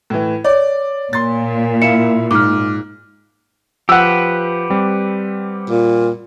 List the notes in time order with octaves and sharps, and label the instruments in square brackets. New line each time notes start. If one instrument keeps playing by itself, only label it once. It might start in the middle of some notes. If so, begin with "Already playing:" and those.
[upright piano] A2 E3
[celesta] C#5 [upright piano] D5
[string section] A#2 [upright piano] C6 A6
[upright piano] E4 F5 [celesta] C#7 E7
[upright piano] G#2 [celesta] D6 F6
[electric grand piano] F3 [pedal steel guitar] G4 B4 [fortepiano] F#5 E6
[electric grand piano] G3 C4
[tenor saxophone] A#2